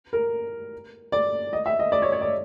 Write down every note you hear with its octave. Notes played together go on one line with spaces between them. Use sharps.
A#4
D5
D#5
E5
D#5
D5
C#5
C#5
D5